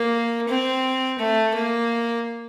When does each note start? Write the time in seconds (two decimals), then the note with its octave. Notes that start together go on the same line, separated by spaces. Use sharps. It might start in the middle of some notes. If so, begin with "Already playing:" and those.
Already playing: A#3
0.48 C4
1.19 A3
1.54 A#3